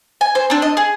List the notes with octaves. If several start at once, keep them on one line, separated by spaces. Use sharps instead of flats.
G#5
C5
C4 D4
D#5
G#4